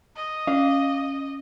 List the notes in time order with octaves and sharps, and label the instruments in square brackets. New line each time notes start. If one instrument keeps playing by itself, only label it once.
[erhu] D#5
[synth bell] C#4 [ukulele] F5